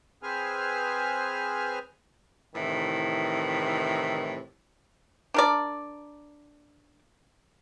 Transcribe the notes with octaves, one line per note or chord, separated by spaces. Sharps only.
C4 G#4 B4 C5 G#5 F6
A2 C3 D#3 E3
D4 A#4 D5